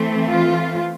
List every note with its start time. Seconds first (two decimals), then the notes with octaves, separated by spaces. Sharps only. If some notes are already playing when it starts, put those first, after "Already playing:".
Already playing: E3 A3 C4
0.27 F4